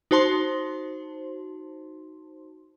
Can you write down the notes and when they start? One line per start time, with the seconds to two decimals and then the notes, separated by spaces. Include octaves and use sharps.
0.11 D#4 F#4 C5 A5 C6